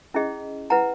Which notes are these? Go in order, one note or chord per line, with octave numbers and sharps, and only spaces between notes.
C#4 E4 G#4 D#5
E4 B4 F#5 A#5